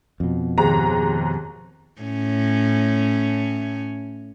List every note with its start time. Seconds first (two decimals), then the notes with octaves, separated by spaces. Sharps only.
0.20 F2 B2
0.58 D#2 G#2 A#5
2.02 A2 C#4